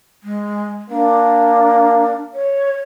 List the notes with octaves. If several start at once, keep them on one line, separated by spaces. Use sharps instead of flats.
G#3
A#3 D4
C#5